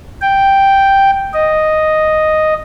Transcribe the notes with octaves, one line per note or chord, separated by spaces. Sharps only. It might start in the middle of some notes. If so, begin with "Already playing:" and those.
G5
D#5